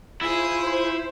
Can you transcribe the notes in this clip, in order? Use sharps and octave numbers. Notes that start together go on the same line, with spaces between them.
E4 F4 G#4 C5 D#6